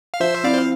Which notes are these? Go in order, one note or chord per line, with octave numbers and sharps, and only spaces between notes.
F5
F3 C5 E5
C4 E4 D5 F5
C5